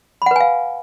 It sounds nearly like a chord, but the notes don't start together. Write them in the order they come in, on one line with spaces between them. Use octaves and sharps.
B5 F#5 B4 G#5 F5